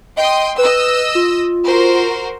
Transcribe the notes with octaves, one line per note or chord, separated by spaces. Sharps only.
D#5 G5 C6 D#6
B4 D#5 E6
F4
F#4 A#4 C5